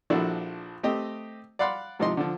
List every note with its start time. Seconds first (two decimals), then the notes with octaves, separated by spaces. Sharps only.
0.10 A#1 F3 D4 E4 F#4 A4
0.83 A3 C4 G4 D#5
1.59 D5 F5 F#5 B5 C6 F#6
1.99 G#2 C3 F3 D#4 D#5 C6
2.17 D3 F3